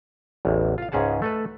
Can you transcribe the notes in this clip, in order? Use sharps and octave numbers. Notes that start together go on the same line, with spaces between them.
A1 E2
F4 F5
C#2 G#2 C#4 G#4 F#5 A5
A3 A4 B4